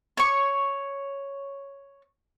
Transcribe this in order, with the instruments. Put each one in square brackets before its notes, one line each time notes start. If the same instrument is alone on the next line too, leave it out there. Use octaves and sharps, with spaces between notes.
[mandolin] C#5 C#6